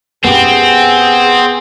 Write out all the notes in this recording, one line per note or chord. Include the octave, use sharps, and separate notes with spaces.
F#2 B3 C4 E4 G4 G#4